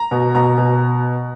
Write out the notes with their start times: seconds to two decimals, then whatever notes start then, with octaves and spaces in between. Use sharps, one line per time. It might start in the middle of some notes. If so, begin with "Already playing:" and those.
Already playing: A#5
0.11 B2
0.35 B2 A#5
0.58 B2